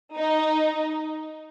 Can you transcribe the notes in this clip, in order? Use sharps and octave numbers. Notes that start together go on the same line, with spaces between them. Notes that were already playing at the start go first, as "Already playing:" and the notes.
D#4